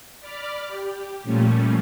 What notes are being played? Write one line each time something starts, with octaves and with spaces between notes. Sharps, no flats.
D5 B5 D6 F6
G4
A#2 F3 G3 A3 C#4